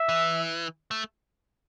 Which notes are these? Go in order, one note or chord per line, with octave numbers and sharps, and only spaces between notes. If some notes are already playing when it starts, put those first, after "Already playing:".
Already playing: E5
E3
A3